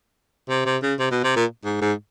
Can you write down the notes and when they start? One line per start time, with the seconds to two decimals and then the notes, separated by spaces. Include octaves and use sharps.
0.49 C3
0.66 C3
0.82 C#3
0.99 C3
1.11 B2
1.24 C3
1.36 A#2
1.65 G#2
1.81 G#2